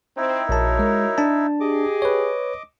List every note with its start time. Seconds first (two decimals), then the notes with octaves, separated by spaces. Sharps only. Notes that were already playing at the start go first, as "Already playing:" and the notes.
0.17 C4 D#4 E4
0.49 A#1 F#4 A#4 C#5 A5
0.79 G#3
1.18 D4 A5
1.60 G4 G#4 D#5 D6
2.02 B4 C#5